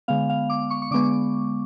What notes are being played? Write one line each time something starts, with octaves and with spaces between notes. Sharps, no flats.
D3 G#3 B3 F5
F5
D6
C#6
C#6
D3 G#3 B3 D6